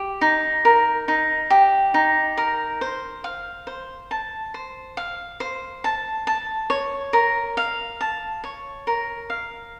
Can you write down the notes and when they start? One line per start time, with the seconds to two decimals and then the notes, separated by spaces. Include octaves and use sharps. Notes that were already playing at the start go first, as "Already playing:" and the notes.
Already playing: G4
0.21 D#4
0.65 A#4
1.08 D#4
1.50 G4
1.94 D#4
2.37 A#4
2.81 C5
3.24 F5
3.67 C5
4.11 A5
4.54 C5
4.97 F5
5.40 C5
5.84 A5
6.27 A5
6.70 C#5
7.13 A#4
7.57 F5
8.01 A5
8.44 C#5
8.87 A#4
9.30 F5